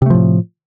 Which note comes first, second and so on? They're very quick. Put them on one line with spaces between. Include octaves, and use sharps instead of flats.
C3 A3 F3 A2